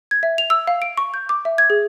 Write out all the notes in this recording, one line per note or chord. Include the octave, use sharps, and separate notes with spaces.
G#6
E5
F7
E6
F5
D7
C#6
G6
D6
E5
G#6
G#4